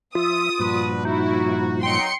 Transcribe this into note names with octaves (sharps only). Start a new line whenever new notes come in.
F3 F4 E5 D#6
G2 A#2 F3 D4 F#4 B4
D#4 E4 F#4
F#3 D#4 G5 C6 C#7